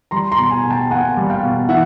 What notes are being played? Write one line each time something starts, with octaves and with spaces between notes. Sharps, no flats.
G3 A#5 C6
A#5 C6
B2
G#5 A#5
B2
G5 A5
A#3 F#5 G#5
G3
F5 G5
B2
E3 E5 F#5